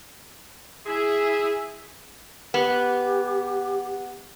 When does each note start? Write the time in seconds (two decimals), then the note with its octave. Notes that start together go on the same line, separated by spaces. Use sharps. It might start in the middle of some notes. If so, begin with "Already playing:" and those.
0.86 E4 G#4 E5
2.54 B3 G4